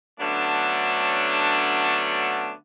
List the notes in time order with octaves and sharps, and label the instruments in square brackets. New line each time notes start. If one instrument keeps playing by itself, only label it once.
[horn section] D3 F#3 A3 B3 C#4 D4